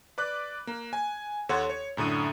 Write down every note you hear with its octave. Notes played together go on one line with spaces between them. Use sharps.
B4 D5 D6 F#6
A#3
G#5
D#2 A4 C#5 F#5 C6
C#5
F#2 A2 D3 D#6 D#7